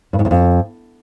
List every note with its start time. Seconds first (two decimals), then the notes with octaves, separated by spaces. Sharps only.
0.13 G2
0.19 G#2
0.25 E2
0.31 F2